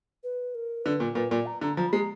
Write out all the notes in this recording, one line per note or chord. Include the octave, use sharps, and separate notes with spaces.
B4
A#4
D3 B4
A#2
A#2 B4
A#2 D5
A#5
D3 A#5
F3 A#5
B5
G#3 A#5